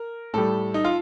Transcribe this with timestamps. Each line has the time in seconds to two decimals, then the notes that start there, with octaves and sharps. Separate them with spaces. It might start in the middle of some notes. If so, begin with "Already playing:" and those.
Already playing: A#4
0.34 A2 G3 A4
0.74 D#4
0.85 F4